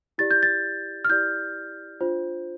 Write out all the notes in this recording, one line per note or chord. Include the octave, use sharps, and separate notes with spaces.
E4 G4 D5 A6
G6
A6
F6
E4 G4 D5 G6
D4 F4 C5